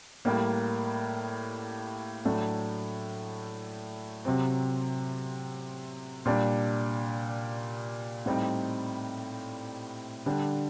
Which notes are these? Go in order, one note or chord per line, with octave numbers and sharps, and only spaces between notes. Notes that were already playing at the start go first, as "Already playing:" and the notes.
A2 G3 A#3
A2 F#3 A3 D4
C3 F#3 C4
A#2 G3 D4
A2 G3 C4 D#4
D3 G3 D4